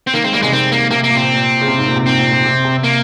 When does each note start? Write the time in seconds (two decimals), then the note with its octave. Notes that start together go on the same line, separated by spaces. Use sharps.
0.07 C4
0.13 D#3 A#3
0.24 G#3 C4
0.33 G3 A#3
0.42 C3 G#3
0.52 D#3 C4
0.72 A#3
0.90 C3 A#3
1.04 A#3
1.10 A#2
1.16 C4
1.22 C3
1.34 A#2
1.61 C#3
1.68 C3
1.78 G#2
1.87 A#2
1.96 C3
2.06 G#2 C4
2.19 A#2
2.32 A#2
2.46 C3
2.65 C3
2.84 A#3